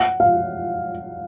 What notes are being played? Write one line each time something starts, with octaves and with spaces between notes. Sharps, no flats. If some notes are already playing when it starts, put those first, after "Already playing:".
Already playing: F#5
F5